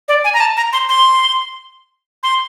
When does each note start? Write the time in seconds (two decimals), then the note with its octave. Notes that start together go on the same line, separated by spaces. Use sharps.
0.08 D5
0.24 G#5
0.34 A#5
0.40 A5
0.57 A#5
0.73 C6
0.89 C6
2.23 C6